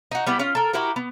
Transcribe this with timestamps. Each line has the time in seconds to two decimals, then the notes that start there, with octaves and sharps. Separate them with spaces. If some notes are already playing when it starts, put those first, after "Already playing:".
0.11 D#4 F#4
0.27 G3 B3 E4 G4
0.39 C#4 F4 F5
0.55 A4 A#4
0.73 E4 F#4 G4 A#4
0.96 B3